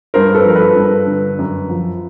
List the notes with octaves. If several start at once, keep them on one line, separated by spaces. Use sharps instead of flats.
G2 A#4 C5
A4 B4
F3 A#4
A4 B4
G2
D3
F#2
F3